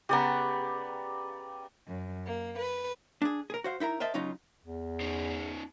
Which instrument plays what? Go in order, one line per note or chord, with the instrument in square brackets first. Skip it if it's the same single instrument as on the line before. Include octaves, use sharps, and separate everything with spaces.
[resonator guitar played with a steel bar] C#3 B3 [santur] G4 D5 A#5
[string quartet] F#2
A#3
B4
[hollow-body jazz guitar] D4 G#4
G#4 A#4
F#4 C5 F5
D#4 E4 A#4 A#5
A#4 C5 D#5 E5 A5
C#2 C#3 F#3 C#4 D#4 F4
[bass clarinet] E2
[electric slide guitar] C#4 D#4 C5